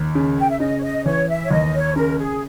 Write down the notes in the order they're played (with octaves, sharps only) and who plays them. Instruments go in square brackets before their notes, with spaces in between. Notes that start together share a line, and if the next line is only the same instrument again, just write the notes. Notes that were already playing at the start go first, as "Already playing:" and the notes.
Already playing: [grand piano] D#2
C#3
[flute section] G5
E5
[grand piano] C#3 [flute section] D#5
[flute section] C#5
D#5
[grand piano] E3 [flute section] C#5
[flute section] E5
C#5
[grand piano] D#2 [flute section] D#5
[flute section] C#5
[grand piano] C#3 [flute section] A#4
[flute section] G#4